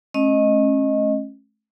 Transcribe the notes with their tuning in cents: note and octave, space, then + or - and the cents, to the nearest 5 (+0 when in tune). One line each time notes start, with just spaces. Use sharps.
A3 -35 C#4 -30 D#5 +0